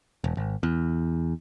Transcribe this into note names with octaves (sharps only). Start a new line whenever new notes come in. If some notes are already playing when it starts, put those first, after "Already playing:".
E1
G#1
E2